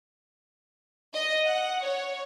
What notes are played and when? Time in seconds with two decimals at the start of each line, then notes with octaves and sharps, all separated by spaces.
1.13 D#5
1.45 F#5
1.82 C#5